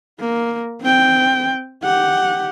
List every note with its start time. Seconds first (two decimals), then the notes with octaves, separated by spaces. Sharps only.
0.20 A#3
0.82 C4 G5
1.84 G4 F#5